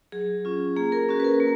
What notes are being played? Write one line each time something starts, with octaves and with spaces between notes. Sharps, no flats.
F#3 G#4
C#4 F4
A#3 G#4
A#4
C#4 F#4
B4
A#4
A#3